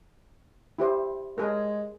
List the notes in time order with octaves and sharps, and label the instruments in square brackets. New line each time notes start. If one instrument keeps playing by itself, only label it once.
[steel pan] E4 G4 C5
[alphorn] G#3 [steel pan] G#4 A#4